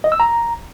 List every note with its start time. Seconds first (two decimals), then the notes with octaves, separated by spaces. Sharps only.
0.04 D#5
0.12 E6
0.20 A#5